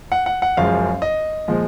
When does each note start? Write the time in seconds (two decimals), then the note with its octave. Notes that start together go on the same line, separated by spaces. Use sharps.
0.12 F#5
0.26 F#5
0.42 F#5
0.57 F#1 F#2 F3 G#3 F5
1.02 D#5
1.48 A#2 F3 G#3